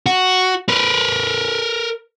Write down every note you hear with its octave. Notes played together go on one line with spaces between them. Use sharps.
F#4
A#4 B4